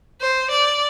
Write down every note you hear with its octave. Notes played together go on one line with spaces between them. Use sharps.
C5
D5